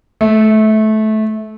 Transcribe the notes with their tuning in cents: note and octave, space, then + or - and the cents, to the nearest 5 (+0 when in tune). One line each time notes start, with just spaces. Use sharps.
A3 -20